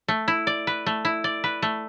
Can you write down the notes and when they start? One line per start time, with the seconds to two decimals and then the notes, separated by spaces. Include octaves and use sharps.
0.08 A3
0.28 E4
0.47 D5
0.67 B4
0.86 A3
1.05 E4
1.24 D5
1.44 B4
1.62 A3